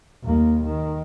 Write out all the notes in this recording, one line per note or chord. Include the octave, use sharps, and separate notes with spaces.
D#2 A#3
D#3